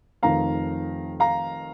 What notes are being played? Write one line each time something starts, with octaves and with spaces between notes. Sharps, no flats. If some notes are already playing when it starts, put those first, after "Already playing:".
F1 F2 D#3 F5 A#5
F5 A#5